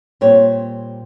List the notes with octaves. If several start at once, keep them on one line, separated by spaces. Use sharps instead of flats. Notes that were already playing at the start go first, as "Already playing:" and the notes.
A#2 G3 C4 C#5